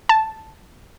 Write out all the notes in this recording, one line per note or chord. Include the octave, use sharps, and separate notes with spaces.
A5